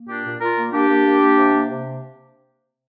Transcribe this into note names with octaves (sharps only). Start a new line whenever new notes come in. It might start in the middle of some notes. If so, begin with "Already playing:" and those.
Already playing: A#3
A#2 D4 G4
A#2
A#2 F4 A#4
A#3
A#3 D4 G4
A#3
A#3
A#3
C3
A#3
C3